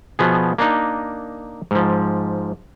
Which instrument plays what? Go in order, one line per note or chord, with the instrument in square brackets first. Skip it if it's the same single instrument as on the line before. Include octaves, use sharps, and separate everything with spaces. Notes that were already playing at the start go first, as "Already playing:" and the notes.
[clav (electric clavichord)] B2 F3 B3 G#4
A#3 D4 D#4
G#2 F3